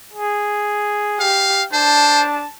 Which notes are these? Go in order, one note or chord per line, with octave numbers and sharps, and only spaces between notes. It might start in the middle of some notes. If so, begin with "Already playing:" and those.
G#4
G4 F5
D4 C5 A5